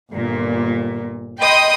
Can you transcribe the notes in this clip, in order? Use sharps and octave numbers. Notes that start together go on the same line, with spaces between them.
G1 A#2
D#5 G5 B5 C6 D#6